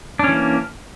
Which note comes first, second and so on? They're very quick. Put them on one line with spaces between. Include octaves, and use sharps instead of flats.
D4 C#4 E3 A#3